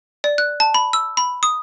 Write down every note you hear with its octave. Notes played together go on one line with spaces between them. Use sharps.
D5
F#6
A5
B5
E6
B5
D#6